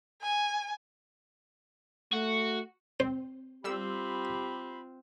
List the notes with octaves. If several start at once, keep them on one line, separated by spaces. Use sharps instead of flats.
G#5
A3 F#4
C4 C5
G3 C4 F4 G4 B5 E6